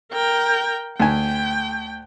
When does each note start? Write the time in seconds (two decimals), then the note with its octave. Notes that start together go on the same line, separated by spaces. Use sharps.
0.12 A#4 G5
1.00 D2 G5 G#5